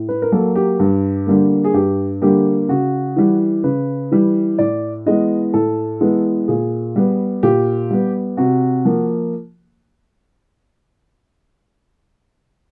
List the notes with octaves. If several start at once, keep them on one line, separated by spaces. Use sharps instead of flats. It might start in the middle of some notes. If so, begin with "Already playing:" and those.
Already playing: A2
B4
A#4
F#3 A#3 A4
G4
G2
D3 G3 A#3
G#4
G2 G4
D3 G3 A#3 G4
C#3 F#4
E3 G3
C#3 B4
E3 G3
A2 D5
E3 G#3 B3 D#5
A2 A4
E3 G#3 B3
A#2 G#4
G3 B3
A#2 G4
G3 B3
C3 F#4
F3 A#3